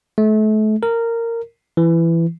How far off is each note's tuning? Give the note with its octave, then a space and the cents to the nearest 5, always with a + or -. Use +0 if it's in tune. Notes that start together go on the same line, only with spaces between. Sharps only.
A3 -35
A#4 -15
E3 +15